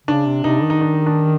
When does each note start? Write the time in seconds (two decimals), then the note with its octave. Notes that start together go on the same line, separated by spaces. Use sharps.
0.07 C#3 D4
0.26 C3
0.44 C3 D#4
0.63 D#3
0.70 D#4
0.81 D4
1.06 D4